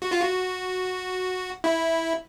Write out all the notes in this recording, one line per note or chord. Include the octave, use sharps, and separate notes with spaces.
F#4
F4
F#4
E4